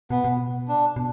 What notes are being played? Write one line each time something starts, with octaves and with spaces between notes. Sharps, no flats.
B2 B3
B2
D4
B2